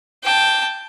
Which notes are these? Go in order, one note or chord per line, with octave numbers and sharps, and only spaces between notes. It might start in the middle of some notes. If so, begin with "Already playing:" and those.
G5 A5